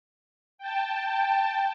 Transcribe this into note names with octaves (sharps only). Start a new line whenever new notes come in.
G5 A5